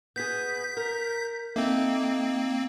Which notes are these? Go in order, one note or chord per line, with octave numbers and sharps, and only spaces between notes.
B3 G#4 G6 B6
A#4
A#3 C4 D#4 A4 E5